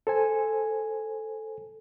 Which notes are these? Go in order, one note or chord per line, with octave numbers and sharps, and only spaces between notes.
A4 C5 G#5